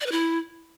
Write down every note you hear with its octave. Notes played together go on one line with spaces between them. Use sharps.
D5
B4
E4